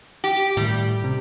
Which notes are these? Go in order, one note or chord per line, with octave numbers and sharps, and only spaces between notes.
G4
A2 D#3 G3 A3
C3